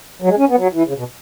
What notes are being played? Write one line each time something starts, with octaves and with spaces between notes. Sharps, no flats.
F#3
G#3
C#4
B3
F#3
E3
C#3
B2